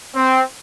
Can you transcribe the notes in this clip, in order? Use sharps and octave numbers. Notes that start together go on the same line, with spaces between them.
C4